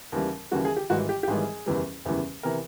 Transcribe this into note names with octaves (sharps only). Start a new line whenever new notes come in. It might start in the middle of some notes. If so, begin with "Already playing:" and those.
D#2 C#3 E3 G3
D#2 C#3 E3 G3 F#4
G#4
G4
G#1 G#2 E3 G3 F#4
G4
G4
G#1 G#2 E3 G3 G#4
F#1 E2 C#3 E3 G3
F#1 E2 C#3 E3 G3
C3 E3 A#4